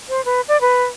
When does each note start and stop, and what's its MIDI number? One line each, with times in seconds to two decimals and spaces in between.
0.09 0.24 72
0.25 0.41 71
0.48 0.60 74
0.61 0.83 71